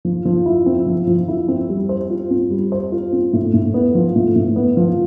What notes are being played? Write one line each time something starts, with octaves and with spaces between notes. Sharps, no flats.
F3
F3
E4
C4
F3
F3
E4
C4
G3
C5
F4
C4
G3
C5
F4
C4
A2
A2
B3
F3
A2
A2
B3
F3